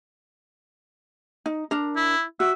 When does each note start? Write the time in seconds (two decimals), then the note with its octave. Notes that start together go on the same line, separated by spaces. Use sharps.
1.46 D#4
1.71 D4 A#4
1.96 E4
2.40 F#4 E5